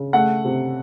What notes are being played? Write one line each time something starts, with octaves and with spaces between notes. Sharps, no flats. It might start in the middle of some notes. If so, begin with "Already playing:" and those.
Already playing: C#3
A3 F#5
C3